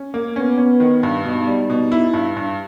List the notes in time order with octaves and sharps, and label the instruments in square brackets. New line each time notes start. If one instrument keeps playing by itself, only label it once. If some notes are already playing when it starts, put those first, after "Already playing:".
Already playing: [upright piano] C#4
A#3
[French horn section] B3 [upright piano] C#4
[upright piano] C#4
D#3
G2
[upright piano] B2 [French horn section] D#4
[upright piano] G3
B2
E4
G2
G2